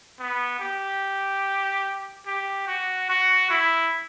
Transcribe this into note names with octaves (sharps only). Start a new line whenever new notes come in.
B3
G4
G4
F#4
F#4
E4